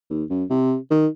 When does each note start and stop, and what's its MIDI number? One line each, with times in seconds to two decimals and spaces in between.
0.10 0.24 39
0.30 0.44 42
0.50 0.76 48
0.91 1.07 51